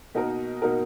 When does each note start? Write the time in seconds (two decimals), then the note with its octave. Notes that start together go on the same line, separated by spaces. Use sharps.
0.15 B2 A#3 D#4 F#4 A#4
0.62 B2 A#3 D#4 F#4 A#4